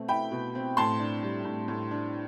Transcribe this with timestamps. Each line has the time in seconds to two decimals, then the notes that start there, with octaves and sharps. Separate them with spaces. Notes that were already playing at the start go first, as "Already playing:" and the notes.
Already playing: B2 A3 C4
0.08 E4 G5 B5
0.31 B2
0.55 C4
0.77 A2 A5 C6
1.00 D4
1.23 G3
1.45 A2
1.68 A2
1.91 D4